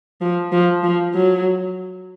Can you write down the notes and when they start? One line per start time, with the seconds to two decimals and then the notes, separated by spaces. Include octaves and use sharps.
0.21 F3
0.52 F3
0.83 F3
1.14 F#3